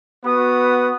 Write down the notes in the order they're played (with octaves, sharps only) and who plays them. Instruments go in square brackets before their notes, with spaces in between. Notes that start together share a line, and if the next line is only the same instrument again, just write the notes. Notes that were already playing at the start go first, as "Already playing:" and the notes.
[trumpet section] B3 F#4 B4 D#6